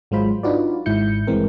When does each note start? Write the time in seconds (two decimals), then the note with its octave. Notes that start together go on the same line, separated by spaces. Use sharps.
0.11 G#1 F#3 G#3 F4 C5 B5
0.43 D4 D#4 F4 F#4 B4 D5
0.86 G#1 G#2 E4 G6 C#7
1.27 G#1 G2 E3 G#3 C4 A#4